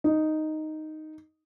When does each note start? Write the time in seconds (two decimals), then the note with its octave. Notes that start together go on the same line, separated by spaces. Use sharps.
0.04 D#4